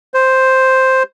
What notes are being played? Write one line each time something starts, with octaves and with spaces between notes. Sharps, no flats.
C5